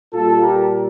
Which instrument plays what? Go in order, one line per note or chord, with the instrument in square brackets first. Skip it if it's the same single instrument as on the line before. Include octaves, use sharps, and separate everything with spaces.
[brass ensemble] A#2 G3 F4 A4
G4 A#4